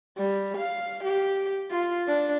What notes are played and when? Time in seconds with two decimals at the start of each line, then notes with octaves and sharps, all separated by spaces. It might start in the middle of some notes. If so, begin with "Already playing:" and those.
0.18 G3
0.58 F5
1.04 G4
1.71 F4
2.08 D4